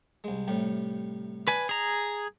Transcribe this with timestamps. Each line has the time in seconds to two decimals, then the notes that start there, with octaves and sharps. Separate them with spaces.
0.24 C2 G#3
0.48 A2 C3 G3
1.48 D4 B4 G#5
1.69 G#4 A#5